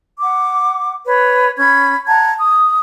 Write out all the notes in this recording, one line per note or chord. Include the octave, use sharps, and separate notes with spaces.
F#5 D6
B4 C#5
C#4 B5 G#6
F#5 A5 A#5 G#6
D#6